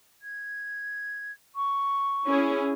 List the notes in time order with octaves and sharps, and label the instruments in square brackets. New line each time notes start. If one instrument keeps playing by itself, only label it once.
[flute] G#6
C#6
[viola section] C#4 E4 G#4